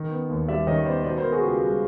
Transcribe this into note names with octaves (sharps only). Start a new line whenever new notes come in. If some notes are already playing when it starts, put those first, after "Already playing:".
Already playing: D#3
B3
D#2
G3 D5 E5
D#3 C#5 D#5
B3 C5 D5
B2 C5 D5
A#4 C5
B3
F#4 G#4
C#2 F4 G4
G3